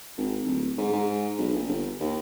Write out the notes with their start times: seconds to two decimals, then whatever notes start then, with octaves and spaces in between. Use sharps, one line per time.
0.18 G#1
0.46 D1
0.78 G#2
0.93 G#2
1.39 B1
1.54 A#1
1.67 G1
2.00 D#2